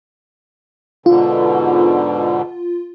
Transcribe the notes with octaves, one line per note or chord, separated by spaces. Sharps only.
G#2 B2 D3 F4